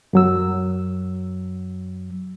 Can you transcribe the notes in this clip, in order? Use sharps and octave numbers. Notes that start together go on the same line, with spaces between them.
F#2 F#3 E6